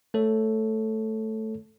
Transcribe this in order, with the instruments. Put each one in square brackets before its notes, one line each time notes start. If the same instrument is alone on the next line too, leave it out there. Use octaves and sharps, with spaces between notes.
[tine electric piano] A3 A4 C#5